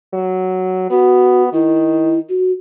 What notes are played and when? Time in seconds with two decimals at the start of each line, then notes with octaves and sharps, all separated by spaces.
0.14 F#3
0.91 B3 F#4
1.53 D#3 E4
2.29 F#4